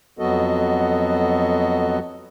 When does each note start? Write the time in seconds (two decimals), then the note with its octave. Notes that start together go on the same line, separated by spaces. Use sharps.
0.19 F2 F#3 B3 F#4 A4 D#5